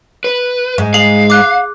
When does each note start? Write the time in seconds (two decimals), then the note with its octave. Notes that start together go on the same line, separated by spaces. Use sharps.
0.24 B4
0.78 G#2 G#3
0.94 G#4 F5 C7 F#7
1.30 D6 F#6